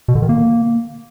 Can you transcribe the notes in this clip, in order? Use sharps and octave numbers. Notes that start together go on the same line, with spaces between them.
B2
D3
D#3
A#3